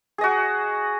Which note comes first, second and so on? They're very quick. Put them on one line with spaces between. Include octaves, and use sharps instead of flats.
G#4 D#5 F#4